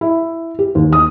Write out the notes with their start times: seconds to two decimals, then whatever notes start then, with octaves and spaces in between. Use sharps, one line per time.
0.01 E4
0.59 G4
0.75 D#2
0.93 D#6